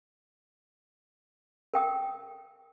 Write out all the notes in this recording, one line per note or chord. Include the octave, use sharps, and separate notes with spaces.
A#4 G5 D#6